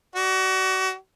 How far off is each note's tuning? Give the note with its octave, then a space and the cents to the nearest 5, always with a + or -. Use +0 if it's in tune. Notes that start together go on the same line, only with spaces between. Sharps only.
F#4 +30 D5 +10